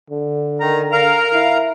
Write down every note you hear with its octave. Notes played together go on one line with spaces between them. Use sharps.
D3
D#3 A#5
A#4 F5 A#5
E4 F5